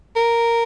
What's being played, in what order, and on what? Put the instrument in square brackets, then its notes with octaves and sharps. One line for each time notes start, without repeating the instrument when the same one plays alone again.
[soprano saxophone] A#4